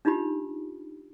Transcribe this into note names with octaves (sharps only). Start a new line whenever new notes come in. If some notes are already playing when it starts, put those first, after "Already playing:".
D4 D#4 F4 G4 B5